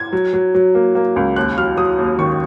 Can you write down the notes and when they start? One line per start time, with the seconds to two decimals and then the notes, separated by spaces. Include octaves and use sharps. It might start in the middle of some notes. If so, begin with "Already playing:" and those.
Already playing: G#6
0.13 F#3
0.33 F#3
0.54 F#3
0.75 A#3
0.95 A#3
1.16 C#2
1.36 D#2 F#6
1.57 F#3 F6
1.78 F#3 D#6
1.98 D#2
2.19 D#3 C#6